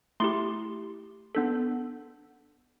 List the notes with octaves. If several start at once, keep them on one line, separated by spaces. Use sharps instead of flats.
A3 E4 G4 C6
B3 D4 A4